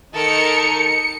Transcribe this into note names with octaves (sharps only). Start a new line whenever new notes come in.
D#3 D#4 A4 A#4 C#7